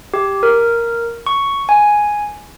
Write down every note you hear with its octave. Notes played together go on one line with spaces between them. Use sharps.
G4
A#4
C#6
G#5